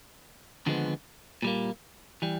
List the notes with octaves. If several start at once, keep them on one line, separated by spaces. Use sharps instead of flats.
D#2 D3 F3 G#3 B3
A#2 G3 A#3
E3 G3